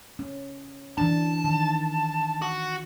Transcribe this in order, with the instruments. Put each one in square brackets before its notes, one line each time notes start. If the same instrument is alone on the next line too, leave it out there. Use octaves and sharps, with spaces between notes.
[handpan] C#4
[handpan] E3 D4 [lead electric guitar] A5
[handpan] D#3
[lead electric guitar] F#4